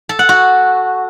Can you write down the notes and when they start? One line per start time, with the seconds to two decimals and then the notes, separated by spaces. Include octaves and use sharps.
0.09 A4
0.19 F#5
0.29 F#4